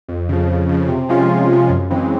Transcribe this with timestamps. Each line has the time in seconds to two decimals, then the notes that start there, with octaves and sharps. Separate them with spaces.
0.08 F2
0.29 C#3 F3
0.49 F2
0.69 C#3 F3
0.88 C3
1.09 F3 G#3 C#4 F4
1.30 C3
1.49 F3 G#3 C#4 F4
1.69 F#2
1.90 C#3 E3 G#3 C4